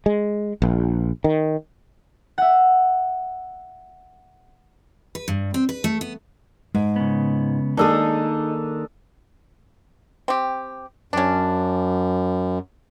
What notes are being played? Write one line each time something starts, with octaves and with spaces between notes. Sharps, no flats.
G#3
A#1
D#3
E5 F#5
B4
G2
C4
B4
A3
B3
G#2 G#3
C#3 B3
D#3 A#3 D4 D#4 G#4 A4 D#6
C4 G4
F#2 C#4 D4